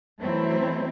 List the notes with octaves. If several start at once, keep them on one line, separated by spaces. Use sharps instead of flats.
E3 F#3 A3 C4 E4